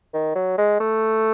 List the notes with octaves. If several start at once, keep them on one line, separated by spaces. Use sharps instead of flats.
D#3
F#3
G#3
A3